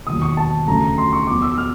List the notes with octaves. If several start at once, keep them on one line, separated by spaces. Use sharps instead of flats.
E1 D#2 D#3 F#3 D#6
C#6
A5
D2 C#3 F#3 A#5
C6
C#6
E2 B2 F#3 D6
E6
F6